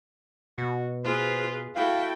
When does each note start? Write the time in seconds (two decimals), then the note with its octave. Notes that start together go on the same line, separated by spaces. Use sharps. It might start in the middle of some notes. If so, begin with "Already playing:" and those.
0.58 B2 F#4
1.04 F4 G#4 B4 C5
1.76 E4 F#4 A4 F5 G5